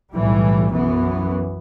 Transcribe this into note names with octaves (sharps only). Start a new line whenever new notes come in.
B1 A2 E3 G3
F#2 E3 B3